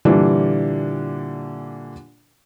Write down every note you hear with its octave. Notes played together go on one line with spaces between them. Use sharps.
A#2 D3 E3 G3 D4